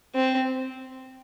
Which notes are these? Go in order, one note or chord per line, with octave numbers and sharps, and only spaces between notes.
C4